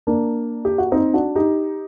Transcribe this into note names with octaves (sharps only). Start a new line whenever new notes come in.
A#3 D4
G4
F#4
C4 D#4
D4 F#4
D#4 G4